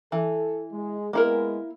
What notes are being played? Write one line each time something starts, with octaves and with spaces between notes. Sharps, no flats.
E3 A4
G#3
G#3 A#3 B3 E4 A#4